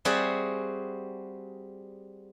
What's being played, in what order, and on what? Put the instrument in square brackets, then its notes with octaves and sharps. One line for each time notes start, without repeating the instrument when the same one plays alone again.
[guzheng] G3 C4 F#4 G#4 E5 F#5